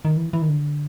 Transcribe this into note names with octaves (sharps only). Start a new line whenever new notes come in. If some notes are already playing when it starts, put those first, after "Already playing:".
D#3
E3
E3
D#3
D3